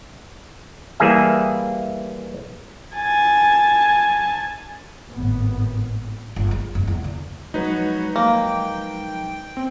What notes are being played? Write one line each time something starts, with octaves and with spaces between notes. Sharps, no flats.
E3 G3 A#3 G#4 E5
G#5 A5
G#1 A2 B3
G1
G#3
F#2
E2
D3
F3 F#3 G#3 B3 D#4 F#4 B4 C#5
A#3 G5
C4